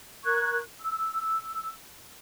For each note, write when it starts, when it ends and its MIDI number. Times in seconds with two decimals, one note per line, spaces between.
0.24 0.59 70
0.24 0.59 85
0.24 0.59 90
0.24 0.59 92
0.79 1.70 88